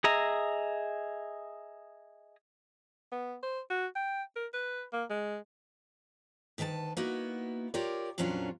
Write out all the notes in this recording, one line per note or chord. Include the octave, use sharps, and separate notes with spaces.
G#4 D#5 E5 A#5
B3
C5
F#4
G5
A#4
B4
A#3
G#3
D2 D#3 B4 C#5 A5
A#3 B3 D#4 E4 F#4
F4 G4 A#4 C#5 D5
F2 A#2 F#3 C#4 D4 F4